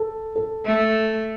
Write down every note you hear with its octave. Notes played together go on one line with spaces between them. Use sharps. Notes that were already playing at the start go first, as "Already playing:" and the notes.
Already playing: A4
A4
A3